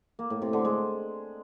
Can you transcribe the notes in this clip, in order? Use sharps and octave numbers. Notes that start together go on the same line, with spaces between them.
A#3
A2
C3
D3
G#3